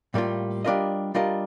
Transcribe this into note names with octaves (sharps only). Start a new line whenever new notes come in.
A2 G3 A#3 F4
G3 D4 F4 A#4 D#5
G3 D4 F4 A#4 D#5